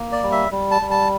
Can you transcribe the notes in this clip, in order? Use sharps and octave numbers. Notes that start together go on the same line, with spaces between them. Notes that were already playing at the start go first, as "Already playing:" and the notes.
Already playing: A#3
D5
G3
E5
G3
A5
G3
A5